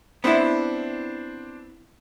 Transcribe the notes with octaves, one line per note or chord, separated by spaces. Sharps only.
B3 C4 D4 E4 C5